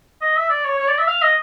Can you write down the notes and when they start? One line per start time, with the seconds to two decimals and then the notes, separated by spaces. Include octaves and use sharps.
0.21 D#5
0.37 E5
0.50 D5
0.65 C#5
0.79 C#5
0.88 D5
0.99 E5
1.08 F5
1.22 D#5